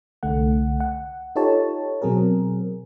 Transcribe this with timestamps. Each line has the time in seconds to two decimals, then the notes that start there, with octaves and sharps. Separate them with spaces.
0.23 C2 D3 A3 F#5
0.80 F#5
1.36 D#4 F4 G4 A4 C#5 A5
2.02 B2 F#3 C4 G#4 A#4